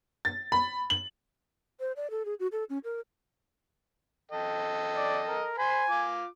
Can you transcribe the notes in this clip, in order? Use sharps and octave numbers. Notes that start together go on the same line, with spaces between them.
A6
B5
F#7
C5
D5
A4
G#4
F#4
A4
C#4
A#4
A4 D#5 G5
D5
A#4
C5 G#5 B5 C6
F4 D6